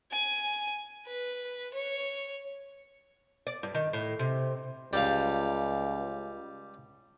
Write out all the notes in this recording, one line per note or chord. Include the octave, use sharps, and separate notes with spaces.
G#5
B4
C#5
D5
G2
D#3
A2
C3
C#2 G3 F5